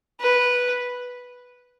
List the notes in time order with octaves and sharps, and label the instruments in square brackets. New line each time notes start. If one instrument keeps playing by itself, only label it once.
[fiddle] B4